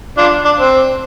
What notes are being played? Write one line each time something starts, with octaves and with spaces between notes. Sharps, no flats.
D4 F4
D4
C4